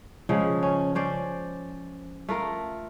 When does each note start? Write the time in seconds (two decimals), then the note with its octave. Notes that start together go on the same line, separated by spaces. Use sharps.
0.29 C#3 F3 G#3
0.63 C#4
0.95 C#4 C5 D5
2.29 A3 F4 A#4